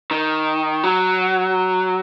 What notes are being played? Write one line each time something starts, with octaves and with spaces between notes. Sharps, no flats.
D#3
F#3